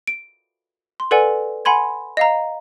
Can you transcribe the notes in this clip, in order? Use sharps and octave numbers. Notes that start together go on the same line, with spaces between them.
D7
C6
A4 B4 D5 F#5 G#5
F#5 G#5 B5 C6 G#6
D#5 F5 A#5